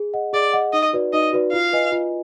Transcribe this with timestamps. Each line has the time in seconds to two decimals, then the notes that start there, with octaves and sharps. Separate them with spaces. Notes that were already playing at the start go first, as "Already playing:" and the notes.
Already playing: G#4
0.14 D#5 F#5
0.33 G#4 D5
0.53 D#5 F#5
0.73 D#4 D#5
0.93 F#4 B4 D5
1.13 D#4 D#5
1.33 F#4 B4 D5
1.53 F4 F5
1.73 B4 D#5 G#5
1.92 F4